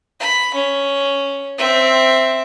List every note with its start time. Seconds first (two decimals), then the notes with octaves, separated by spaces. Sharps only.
0.20 B5
0.55 C#4
1.58 C4 E5